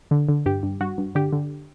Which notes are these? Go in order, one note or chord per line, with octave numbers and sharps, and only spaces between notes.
D3
D3
G2 G4
G2
G2 F#4
G2
D3 G4
D3